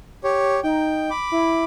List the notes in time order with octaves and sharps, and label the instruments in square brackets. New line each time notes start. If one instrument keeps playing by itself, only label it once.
[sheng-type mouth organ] G4 C#5
[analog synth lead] D#4 [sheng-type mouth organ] G5
[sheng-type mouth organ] B5 D6
[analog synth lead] E4